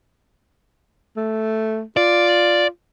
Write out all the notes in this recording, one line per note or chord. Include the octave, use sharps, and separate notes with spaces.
A3
F4 D5